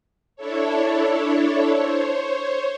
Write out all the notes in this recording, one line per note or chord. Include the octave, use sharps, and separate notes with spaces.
D4 E4 A4 C#5
C5 C#5